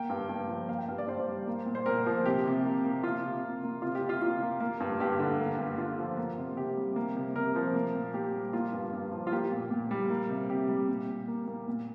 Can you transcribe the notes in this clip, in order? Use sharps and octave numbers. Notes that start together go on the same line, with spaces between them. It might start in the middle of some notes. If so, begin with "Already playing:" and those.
Already playing: A#3 G5
G2
G2
F3
A#3 F5
G5
G2 F5
D5
G2 C5
G3
A#3
A#2
C5
A#2 A#4
F3
C3 G4
C3
A#3
A#3
C3 F4
C3
A#3
A#3
C3 F4
G4
C3
F4
A#3 F4
A#3
A#3
G2
G2 G4
D3
A#3
G2
G2 F4
F3
A#3
C3
C3 G4
G3
A#3
C3
C3 A#4
F3
A#3
A#2
A#2 G4
G3
A#3 F4
G2
G2
F3
F4
A#3 G4
A#2
A#2
G3
A#3
C3
C3 G4
G3
A#2
A#2
A#3
A#3
A#2